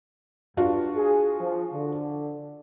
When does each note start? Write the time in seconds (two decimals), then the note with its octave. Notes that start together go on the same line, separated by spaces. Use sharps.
0.57 G2 D4 F4 F#4
0.95 G#4
1.40 F3
1.73 D3